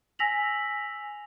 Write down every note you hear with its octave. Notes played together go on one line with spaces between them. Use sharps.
G#5 E6 A#6 B6 F7 F#7